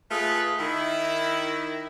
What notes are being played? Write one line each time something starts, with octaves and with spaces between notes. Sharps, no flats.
A3 F4 G#4 A4 B4
D#3 E4